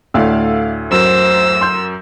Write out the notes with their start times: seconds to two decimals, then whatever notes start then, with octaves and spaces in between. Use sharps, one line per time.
0.14 D2 A2 A3 D5 F5 E6
0.91 F#2 F#3 A#4 C5 E6
1.61 C6 G6